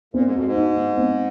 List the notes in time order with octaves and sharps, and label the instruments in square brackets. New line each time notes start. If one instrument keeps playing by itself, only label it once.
[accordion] A#2 [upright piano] C4
[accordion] G#2
[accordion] F2 [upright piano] F#4
[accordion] G#2
[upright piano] D#4
G#3
C4